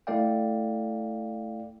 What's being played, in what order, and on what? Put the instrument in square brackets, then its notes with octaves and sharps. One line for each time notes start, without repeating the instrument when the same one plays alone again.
[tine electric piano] A3 E4 A4 D5 F5 G5